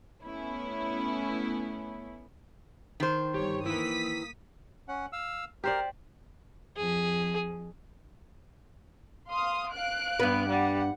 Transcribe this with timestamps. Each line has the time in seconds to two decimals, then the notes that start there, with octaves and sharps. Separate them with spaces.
0.23 A3 B3 C#4 E4
3.00 D#3 C5
3.34 G1 G4 C#5
3.66 A#3 E4 B4 D#6 B6
4.88 C#4 F#5
5.13 F5 E6
5.64 G4 A#4 C5 D5
6.77 F2 F3 G#4
9.29 F5 C6 D#6
9.74 F5 F#6 D7
10.20 G2 B3 B4
10.48 G3 F#5